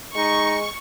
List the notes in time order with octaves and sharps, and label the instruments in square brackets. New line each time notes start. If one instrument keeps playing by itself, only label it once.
[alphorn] G#3 [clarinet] D#4 [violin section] C#6